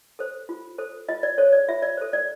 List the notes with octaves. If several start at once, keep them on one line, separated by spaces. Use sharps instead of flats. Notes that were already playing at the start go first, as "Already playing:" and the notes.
A4 C5
F4
A4 C5
F4 D#5
D5
A4 C5 C#5
D5
F4 E5
D5
A4 C5
D5